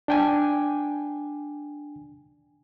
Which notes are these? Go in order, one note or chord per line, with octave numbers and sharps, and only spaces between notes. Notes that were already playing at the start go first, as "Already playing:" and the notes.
D4 G5 G#5